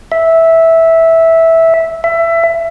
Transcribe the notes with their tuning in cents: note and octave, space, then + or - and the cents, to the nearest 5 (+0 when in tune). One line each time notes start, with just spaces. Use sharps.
E5 -10
E5 +20